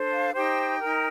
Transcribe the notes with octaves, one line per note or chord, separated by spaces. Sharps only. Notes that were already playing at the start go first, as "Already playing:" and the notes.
Already playing: D4 A4 C5
F5
D#4 G4 C5 G5
D#4 A#4